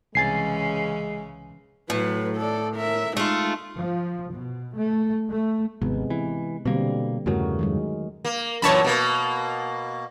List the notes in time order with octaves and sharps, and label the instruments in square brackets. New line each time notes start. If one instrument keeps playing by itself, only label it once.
[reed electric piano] C2 G#5 A6 [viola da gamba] C#3 E3 C#4 [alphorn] G#3 [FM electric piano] C7
[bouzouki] A2 [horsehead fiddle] F#3 B4
[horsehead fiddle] A4 D5
A#4 E5
[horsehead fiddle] G#3 D#4 [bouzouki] A3 F4
[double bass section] F3
B2
A3
A3
[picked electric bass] G#1 [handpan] C3 G#3 B3
[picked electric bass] E3
[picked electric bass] B2 A#3 [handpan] D3 G3 C4
[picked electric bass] E2 G2 C#3 [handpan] A3 F#4 A#4
[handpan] D#3 F#3 G#3
[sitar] A#3
[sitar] F#2 A#2 E3 [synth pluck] C#5 A5 B5
[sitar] B2 A#3